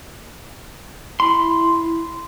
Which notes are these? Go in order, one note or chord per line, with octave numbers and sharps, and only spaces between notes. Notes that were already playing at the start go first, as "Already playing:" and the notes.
E4 B5 C6